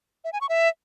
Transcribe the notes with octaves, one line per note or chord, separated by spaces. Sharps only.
E5
G#5
C#6
E5